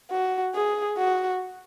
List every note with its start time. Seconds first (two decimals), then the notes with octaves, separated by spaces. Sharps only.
0.11 F#4
0.55 G#4
0.98 F#4